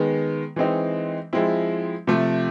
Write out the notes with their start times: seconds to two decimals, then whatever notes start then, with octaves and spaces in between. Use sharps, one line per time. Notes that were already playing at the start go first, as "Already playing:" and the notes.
Already playing: D#3 G#3 B3
0.56 E3 G#3 C4 D#4
1.33 F3 G#3 C4 E4
2.07 C3 F3 A3